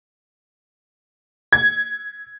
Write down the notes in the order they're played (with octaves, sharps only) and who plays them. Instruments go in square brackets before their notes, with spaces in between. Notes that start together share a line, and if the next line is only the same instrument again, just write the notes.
[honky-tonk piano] G#6